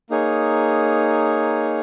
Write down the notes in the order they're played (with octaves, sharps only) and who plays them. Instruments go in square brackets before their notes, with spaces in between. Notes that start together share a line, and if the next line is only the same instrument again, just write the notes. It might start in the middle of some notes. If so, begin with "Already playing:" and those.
[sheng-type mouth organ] A#3 D#4 G#4 C#5